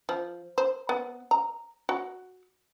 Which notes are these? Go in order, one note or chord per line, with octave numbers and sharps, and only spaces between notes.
F3
C5
B3
A#5
F#4